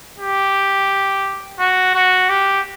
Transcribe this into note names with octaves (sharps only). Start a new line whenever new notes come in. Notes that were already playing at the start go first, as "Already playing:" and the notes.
G4
F#4
F#4
G4